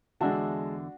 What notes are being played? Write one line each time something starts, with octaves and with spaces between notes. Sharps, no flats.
E2 D3 G#3 D4 F#4 E5 A5